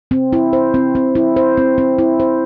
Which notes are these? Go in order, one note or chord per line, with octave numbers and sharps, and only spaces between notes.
C4
E4
C5
C4
C4
E4
C5
C4
C4
E4
C5